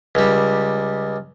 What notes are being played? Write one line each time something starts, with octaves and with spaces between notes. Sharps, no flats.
C#2 G3